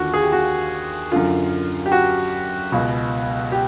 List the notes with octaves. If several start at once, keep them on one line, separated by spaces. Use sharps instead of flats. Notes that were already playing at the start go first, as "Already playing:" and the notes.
Already playing: D#2 D3 F4 F#4
G#4
G4
F#4
F#2 D3 F4
G4
F#4
C#2 B2
G4